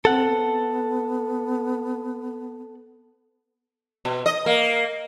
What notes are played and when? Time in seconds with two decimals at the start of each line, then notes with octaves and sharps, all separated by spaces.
0.05 C4 A4 F#5
0.27 B3
4.05 B2
4.26 D#5
4.46 A#3